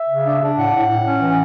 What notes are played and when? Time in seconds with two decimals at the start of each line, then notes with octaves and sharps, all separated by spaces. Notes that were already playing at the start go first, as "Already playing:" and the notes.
Already playing: E5
0.09 C#3
0.26 D4
0.41 D4
0.57 A2 F#5
0.74 A2
0.90 A2
1.06 C#4
1.21 E3